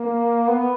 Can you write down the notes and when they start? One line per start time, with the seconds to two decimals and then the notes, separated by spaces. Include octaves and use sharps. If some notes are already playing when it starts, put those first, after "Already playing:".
Already playing: A#3
0.49 B3